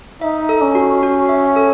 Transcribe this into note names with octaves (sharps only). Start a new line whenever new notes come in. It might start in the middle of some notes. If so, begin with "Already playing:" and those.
D#4 E5
A4
C#4
F#4
F#4
E5
A4